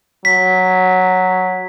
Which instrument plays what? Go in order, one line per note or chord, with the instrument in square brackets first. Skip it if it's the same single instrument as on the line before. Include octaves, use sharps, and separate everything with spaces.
[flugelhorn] F#3 [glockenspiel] B6